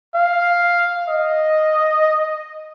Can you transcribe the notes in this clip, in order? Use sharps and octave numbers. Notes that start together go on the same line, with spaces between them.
F5
D#5